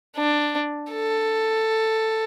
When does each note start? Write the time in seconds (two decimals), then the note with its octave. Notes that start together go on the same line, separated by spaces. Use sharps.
0.18 D4
0.93 A4